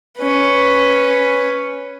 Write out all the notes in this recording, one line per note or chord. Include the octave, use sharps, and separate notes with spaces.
C#4 B4